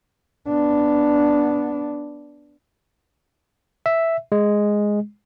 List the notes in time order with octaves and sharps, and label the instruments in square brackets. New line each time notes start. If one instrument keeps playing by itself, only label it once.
[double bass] B3 D4
[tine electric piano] E5
G#3